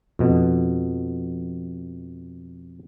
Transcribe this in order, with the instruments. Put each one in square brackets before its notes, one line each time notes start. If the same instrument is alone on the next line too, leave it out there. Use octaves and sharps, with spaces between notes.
[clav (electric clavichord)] F2 B2